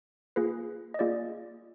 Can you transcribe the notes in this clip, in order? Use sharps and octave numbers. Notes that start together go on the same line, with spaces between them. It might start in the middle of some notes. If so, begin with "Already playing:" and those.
A#3 F4 G#4 B4
D#5
A#3 F4 G#4 D5